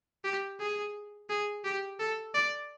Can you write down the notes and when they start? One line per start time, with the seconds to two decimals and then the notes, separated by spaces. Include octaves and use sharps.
0.24 G4
0.60 G#4
1.29 G#4
1.64 G4
1.99 A4
2.34 D5